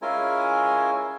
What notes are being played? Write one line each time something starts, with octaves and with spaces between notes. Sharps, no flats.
G#3 C#4 E4 F4 A#4 G#5